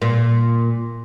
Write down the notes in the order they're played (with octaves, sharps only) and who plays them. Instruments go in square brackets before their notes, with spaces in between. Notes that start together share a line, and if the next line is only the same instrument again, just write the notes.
[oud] A#2